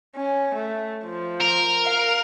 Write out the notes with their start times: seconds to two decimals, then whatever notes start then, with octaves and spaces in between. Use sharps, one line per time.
0.16 C#4
0.55 A3
1.04 F3
1.41 A#4
1.85 F5